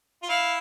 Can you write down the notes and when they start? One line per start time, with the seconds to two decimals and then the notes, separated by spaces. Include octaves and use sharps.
0.23 F4
0.29 E4 F5